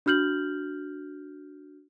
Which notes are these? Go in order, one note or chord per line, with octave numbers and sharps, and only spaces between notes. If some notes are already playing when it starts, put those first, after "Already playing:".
D4 F#4 F6 G6 F#7